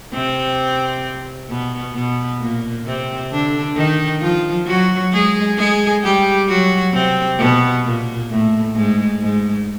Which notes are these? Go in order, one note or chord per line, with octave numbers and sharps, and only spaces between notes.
C3 C4
B2 B3
B2 B3
A#2 A#3
C3 C4
D3 D4
D#3 D#4
F3 F4
F#3 F#4
G#3 G#4
G#3 G#4
G3 G4
F#3 F#4
C3 C4
B2 B3
A#2 A#3
A2 A3
G#2 G#3
G#2 G#3